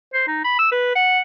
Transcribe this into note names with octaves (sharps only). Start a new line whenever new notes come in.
C5
D#4
B5
E6
B4
F#5